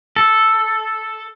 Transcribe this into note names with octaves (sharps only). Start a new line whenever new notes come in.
A4